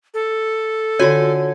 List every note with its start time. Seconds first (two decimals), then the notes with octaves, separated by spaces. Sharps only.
0.14 A4
0.99 D3 F4 F#4 C#5 G#5